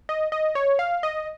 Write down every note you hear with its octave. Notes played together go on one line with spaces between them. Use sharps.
D#5
D#5
C#5
F5
D#5